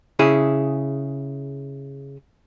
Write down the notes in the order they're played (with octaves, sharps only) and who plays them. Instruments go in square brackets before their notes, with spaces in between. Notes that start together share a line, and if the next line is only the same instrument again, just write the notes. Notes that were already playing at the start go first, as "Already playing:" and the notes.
[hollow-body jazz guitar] C#3 E4 G#4